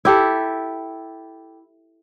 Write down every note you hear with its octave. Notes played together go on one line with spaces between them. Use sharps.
E4 G4 A4